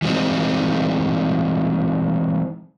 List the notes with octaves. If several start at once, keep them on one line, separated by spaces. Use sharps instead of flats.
E3 G3 G#3 C4 D#4